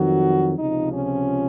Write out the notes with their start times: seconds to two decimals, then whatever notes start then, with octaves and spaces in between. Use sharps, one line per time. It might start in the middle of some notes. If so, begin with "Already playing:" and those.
Already playing: F2 D#3 F#3 F#4
0.58 C#2 C3 F3 D#4
0.92 C#4